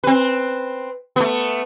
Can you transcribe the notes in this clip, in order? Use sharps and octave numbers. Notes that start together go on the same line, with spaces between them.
C4 B4
A3 B3